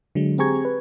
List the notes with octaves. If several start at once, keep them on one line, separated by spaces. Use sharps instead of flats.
D3 F#3 G#3
C4 G4 G#4 A#5 C#6 G#6
B4